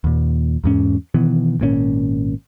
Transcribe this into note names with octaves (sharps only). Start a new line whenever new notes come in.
D#2 A#2
E2 G#2 C#4
B2 D#3 E3 B3
G#1 A#2 D3 C#4